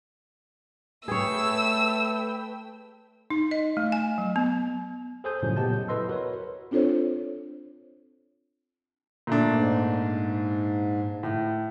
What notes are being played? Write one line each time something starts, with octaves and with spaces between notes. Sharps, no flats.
A3 G#4 B4 C#5 G5 E6
D#4
D#5
A3
G#5
F#3
B3
G#4 A4 C5 G#5 D#6 G6
F#2 A2 C#3 F3 F#3
A#2 B3 G4 D#5 A5 G6
F#3
E4 A4 B4 D#5 C6 E6
F#4 A#4 B4 C#5
C4 D4 F4 A4 C5 C#5
A#2 A3 D4
G#2
A2